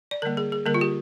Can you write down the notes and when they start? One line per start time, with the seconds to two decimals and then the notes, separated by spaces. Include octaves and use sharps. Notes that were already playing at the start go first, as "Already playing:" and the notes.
0.11 D5
0.22 D3 G3 A#3 A#4
0.37 G#4
0.52 G#4
0.66 D3 G3 A#3 A#4
0.74 F4
0.81 G4